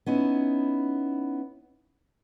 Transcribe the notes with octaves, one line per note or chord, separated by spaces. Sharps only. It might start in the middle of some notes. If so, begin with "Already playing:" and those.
B3 C#4 D#4 E4